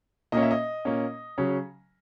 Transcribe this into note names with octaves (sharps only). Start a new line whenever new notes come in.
A#2 A#3 C#4 D#5
E5
D#5
A#2 A#3 C#4
C#3 F#3 C#4